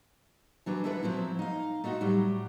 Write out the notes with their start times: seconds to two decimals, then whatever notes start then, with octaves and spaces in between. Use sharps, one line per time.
0.66 E3 F#3 D4 B4
0.84 D2 D3 E4 A4 B4 E5
1.03 F3 F#3 C4 E4
1.39 D#4 F5
1.84 A3 D#4 F4 F#4
2.01 A2 F#3 G3